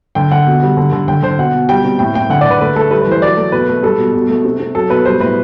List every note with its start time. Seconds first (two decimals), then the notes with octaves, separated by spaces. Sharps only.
0.15 D3 G5
0.31 D3 F#5
0.47 B2
0.62 G3
0.77 D3
0.92 D3
1.08 D3 G5
1.23 D3 C5
1.38 B2 F#5
1.54 B2
1.69 G3 G5
1.85 C3
1.99 A2 G5
2.14 A2 G5
2.30 D3 F#5
2.41 D5
2.46 D3 B4
2.61 A3 B4
2.76 A3 A4
2.91 G3 B4
3.01 B4
3.06 E3
3.11 C5
3.22 F#3 D5
3.37 A3
3.52 B2 B4
3.68 A3
3.83 G3 A4
3.99 B2
4.14 B2
4.29 A3
4.45 C3
4.60 C3
4.74 F#3 A4
4.90 B2 B4
5.05 G3 C5
5.20 A2 B4